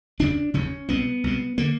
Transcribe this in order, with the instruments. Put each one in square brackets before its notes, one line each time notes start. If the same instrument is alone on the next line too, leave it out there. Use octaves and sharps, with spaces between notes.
[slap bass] F1 D#2 C#3 D4
F1 D#2 C#3 C#4
C2 B2 B3
C2 B2
D3 A#3